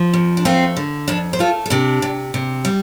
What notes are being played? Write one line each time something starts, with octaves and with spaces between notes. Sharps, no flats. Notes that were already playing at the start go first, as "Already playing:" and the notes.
Already playing: F3
F2
D4
A3 C4 F4
D3
F2 D4
C5
A3 F4 A4
A4
C3 D4 G4
C3
C3
G3